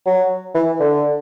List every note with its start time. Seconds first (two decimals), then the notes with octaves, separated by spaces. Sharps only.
0.06 F#3
0.55 E3
0.80 D3